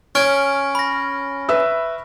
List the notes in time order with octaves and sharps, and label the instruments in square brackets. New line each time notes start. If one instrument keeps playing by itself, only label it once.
[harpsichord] C#4 [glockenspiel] C#6 F6 D7
[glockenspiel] B5 A#6
[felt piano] B4 E5 E6